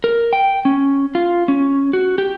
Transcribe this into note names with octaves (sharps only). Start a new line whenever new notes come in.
A#4
G5
C#4
F4
C#4
F#4
G4